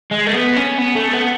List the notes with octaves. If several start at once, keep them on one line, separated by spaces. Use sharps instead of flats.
G#3
A3
B3
C#4
B3
A3
B3